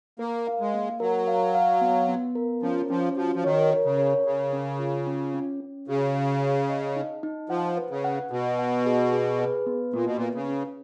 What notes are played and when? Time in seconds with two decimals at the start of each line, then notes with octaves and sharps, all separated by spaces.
0.19 A#3 A#4
0.47 F5
0.60 G#3
0.74 A#3
1.00 F#3 A#4
1.27 F5
1.55 F5
1.81 B3
2.09 B3
2.35 A#4
2.62 F3 C#4
2.90 F3 C#4
3.17 F3 F#4
3.35 F3
3.44 D#3 C#5
3.71 A#4
3.85 C#3
3.98 C#5
4.26 C#3 A#4
4.53 C#4
4.79 F4
5.06 C#4
5.34 C#4
5.60 C#4
5.88 C#3 F#4
6.15 F5
6.42 F5
6.69 D#5
6.96 D#4
7.23 D#4
7.50 F3 F#5
7.77 B4
7.90 C#3
8.04 F#5
8.31 B2 F#5
8.59 F#5
8.86 G#4
9.13 G#4
9.39 B4
9.66 B3
9.93 A#2 A#3
10.06 B2
10.16 A#2
10.21 B4
10.35 C#3
10.48 C#4